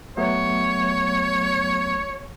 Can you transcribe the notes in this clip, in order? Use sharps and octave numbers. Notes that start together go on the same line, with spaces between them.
F#3 A3 B3 C#5